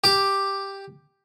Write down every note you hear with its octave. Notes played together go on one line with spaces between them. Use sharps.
G4 D6